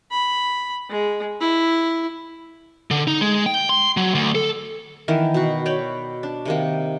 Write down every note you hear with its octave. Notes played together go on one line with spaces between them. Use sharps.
B5
G#3
E4
D3
D#4
G#3
G5
C6
F#3
D2
A4
D#3 E3 B3 A#4
B2 F#4
C#5 D5 G5 B5
D4
C3 D#3 A#3